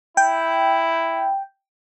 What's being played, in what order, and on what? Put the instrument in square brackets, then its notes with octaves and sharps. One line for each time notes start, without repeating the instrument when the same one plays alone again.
[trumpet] E4 [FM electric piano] G5